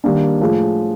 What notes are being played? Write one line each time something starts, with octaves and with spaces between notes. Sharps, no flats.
D#3 G3 A#3 D4
A2 F3 G#3